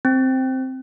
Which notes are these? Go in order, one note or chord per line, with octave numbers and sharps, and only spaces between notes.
C4